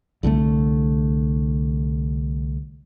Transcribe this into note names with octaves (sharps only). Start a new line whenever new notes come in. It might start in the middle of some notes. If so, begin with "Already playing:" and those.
C2 D3 E3 A3